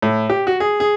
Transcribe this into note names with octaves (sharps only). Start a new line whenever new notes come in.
A2
G4
F#4
G#4
G#4